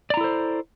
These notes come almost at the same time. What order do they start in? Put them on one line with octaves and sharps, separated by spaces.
D5 A#5 E4 A4 C5